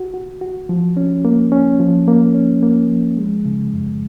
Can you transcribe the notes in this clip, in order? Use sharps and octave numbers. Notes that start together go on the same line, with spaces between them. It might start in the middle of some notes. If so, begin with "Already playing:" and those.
Already playing: F#4
F#4
F#4
F3
C#4
A#3
C#4
F3
A#3
C#4
A#3
F3
G#3
C#3
F#2